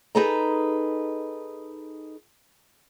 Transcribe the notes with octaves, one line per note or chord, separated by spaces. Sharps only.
D#4 G#4 A4 B4 D#5 A#5